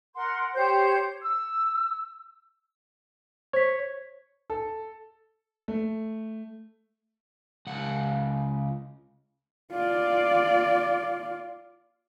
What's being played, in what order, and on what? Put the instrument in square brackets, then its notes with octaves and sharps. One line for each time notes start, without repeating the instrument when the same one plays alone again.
[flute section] A#4 F#5 C6
G4 C5 C#5 G6
E6
[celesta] C5 B6 [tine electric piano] C#5
[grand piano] A4
A3
[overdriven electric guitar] C#2 F#5
[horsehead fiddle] F4 D5